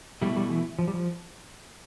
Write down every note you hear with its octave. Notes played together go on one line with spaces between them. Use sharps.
B2 G3 A3 E4
G3
E3
F3
G3
F3